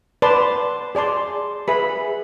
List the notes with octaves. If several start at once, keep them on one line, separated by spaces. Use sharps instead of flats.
B4 D5 A5 C6
G#4 D5 A5 C6
G#4 B4 E5 B5